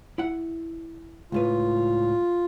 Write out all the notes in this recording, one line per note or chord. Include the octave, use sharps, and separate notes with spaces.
E4 F#5
C#2 A2 F4 B4